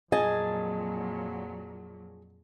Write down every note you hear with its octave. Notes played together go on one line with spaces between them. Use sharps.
F2 A#2 F#3 G#4 D#5 G#5 A5